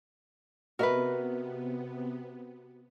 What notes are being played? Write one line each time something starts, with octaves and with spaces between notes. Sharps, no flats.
C3 B3 F#4 A#4 B4 D#5 E5